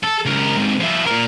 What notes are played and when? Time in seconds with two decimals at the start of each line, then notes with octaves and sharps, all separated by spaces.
0.03 A4
0.25 C#2 A#4
0.57 G#2 C3
0.80 F3 E4
1.06 A#2 A#4